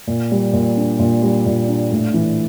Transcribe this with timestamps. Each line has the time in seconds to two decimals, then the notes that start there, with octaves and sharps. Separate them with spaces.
0.07 A#2
0.32 G3
0.53 A#2
0.77 D4
0.99 A#2
1.23 G3
1.46 A#2
1.69 D4
1.92 A2
2.14 E3